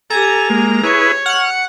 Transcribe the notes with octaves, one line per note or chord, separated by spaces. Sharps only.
G4 A4 G#5 A#5
G#3 A#3
E4 G#4 B4 C#5 C#6
F#5 F6